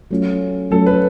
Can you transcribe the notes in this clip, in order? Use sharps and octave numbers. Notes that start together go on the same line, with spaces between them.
F#3 A3 C#4 F4
F#3 A3 C#4 F4 A4
B4